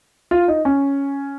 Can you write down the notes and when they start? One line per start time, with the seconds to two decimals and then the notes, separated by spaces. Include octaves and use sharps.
0.31 F4
0.48 D#4
0.65 C#4